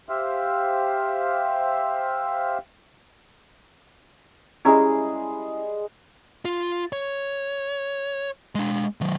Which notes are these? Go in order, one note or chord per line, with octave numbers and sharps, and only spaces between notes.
G4 C5 E5 F5
G3 G#3 C#4 E4 G#4 A#5
F4
C#5
G#3 D4
D#3 F#3